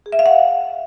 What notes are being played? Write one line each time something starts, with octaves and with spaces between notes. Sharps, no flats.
G#4
E5
F5
F#5